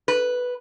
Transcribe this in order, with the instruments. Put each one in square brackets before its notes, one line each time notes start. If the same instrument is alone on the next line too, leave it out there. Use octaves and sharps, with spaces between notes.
[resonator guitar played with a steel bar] B4